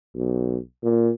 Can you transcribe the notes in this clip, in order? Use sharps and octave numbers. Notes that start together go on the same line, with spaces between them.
B1
A#2